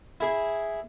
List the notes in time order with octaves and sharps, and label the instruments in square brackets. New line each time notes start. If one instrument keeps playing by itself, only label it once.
[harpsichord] E4 G#4